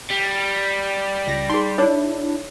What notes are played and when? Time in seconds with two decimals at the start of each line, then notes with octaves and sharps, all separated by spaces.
0.11 G3
1.27 C#2 A#6
1.50 D#4 G#4 C6
1.78 D4 E4 C#5